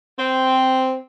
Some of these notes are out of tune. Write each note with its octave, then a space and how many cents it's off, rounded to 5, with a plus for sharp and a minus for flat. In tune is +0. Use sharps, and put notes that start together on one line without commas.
C4 -5